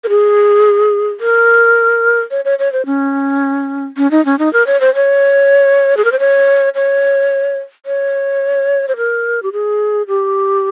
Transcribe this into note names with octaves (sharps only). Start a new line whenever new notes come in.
A#4
G#4
A#4
C#5
C#5
C#5
C5
C#4
C#4
D#4
C#4
D#4
A#4
C#5
C5
C#5
G#4
A#4
C5
C#5
C#5
C#5
C5
A#4
G4
G#4
G4